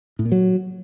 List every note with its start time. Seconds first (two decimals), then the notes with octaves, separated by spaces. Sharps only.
0.19 A2
0.25 A#2
0.32 F#3